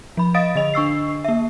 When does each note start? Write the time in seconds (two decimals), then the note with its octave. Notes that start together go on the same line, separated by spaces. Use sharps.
0.17 F3 B5
0.34 D#5 F5 D#6 A6 D7
0.55 D3 D#5 F7
0.74 D4 C#6 E6 C7
1.24 A#3 E5